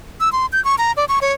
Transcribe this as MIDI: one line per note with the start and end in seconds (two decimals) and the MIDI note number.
0.20 0.32 88
0.32 0.46 84
0.53 0.63 91
0.65 0.75 85
0.78 0.92 82
0.97 1.05 74
1.09 1.19 85
1.22 1.33 73